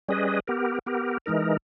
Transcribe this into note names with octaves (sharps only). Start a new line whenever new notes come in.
G3 C#4 G#4 B4 D#5
B3 G4 A#4
B3 G4 A#4
E3 G#3 D#4 A#4